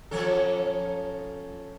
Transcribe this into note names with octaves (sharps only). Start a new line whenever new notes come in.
F3 C#4 A4